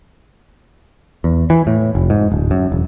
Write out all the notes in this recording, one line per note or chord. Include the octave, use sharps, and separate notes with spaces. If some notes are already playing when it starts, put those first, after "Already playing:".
E2
E3
A2
F1
G#2
D1
F#2
E1